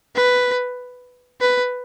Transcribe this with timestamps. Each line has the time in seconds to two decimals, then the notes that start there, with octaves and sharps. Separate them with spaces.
0.16 B4
1.41 B4